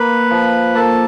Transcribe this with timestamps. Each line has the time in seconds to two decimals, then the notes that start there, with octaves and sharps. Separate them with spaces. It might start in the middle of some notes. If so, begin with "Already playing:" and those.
Already playing: A#3 B4 B5
0.31 F3
0.75 A#3 A4 A5